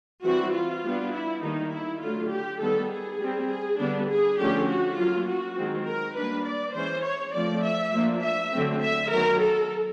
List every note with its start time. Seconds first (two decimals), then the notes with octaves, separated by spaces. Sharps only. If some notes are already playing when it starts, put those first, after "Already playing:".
0.25 E3 G3 C4 F#4
0.54 F4
0.84 G3 B3 D4
1.14 E4
1.43 D#3 G3 A#3 D#4
1.73 E4
2.01 D3 F#3 A3 F4
2.31 G4
2.61 D#3 G3 B3 A4
2.90 G#4
3.21 G3 C4
3.49 G#4
3.79 D3 G3 B3 D4
4.09 G#4
4.38 D3 F3 A3 C#4 G4
4.69 F#4
4.98 F#3 A#3 C#4 F4
5.27 F#4
5.57 D#3 G#3 C4
5.86 A#4
6.16 G3 A#3 D4 B4
6.45 D5
6.75 E3 G#3 C#4 C5
7.04 C#5
7.34 F3 A3 C4 D5
7.64 E5
7.94 F3 A#3 D4
8.23 E5
8.53 D3 F#3 A3 C4
8.81 E5
9.11 D#3 F#3 B3 A#4
9.41 A4